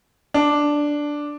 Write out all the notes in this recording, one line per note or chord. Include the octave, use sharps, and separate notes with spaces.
D4